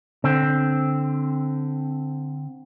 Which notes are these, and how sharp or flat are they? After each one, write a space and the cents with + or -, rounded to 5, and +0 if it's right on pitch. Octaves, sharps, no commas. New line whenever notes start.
D3 +0 C4 +5